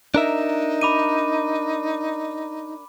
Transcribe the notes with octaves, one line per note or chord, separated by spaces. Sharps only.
D4 D#4 A#4 E5
B5 D6 D#7